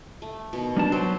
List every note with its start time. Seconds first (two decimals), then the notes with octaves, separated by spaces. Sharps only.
0.22 A3
0.53 B2 D#3
0.77 G3 D4 A5
0.92 F#3 G4 B4 C5